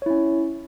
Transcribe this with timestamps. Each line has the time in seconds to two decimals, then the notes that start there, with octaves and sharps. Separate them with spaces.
0.02 C#5
0.06 E4
0.10 C#4